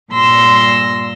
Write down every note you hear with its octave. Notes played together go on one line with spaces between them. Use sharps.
G2 A#2 C6 E6 A#6